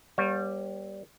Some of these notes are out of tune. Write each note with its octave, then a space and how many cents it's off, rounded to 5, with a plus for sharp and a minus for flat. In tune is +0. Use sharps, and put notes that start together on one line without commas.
G3 +0 B3 -45 C#5 -30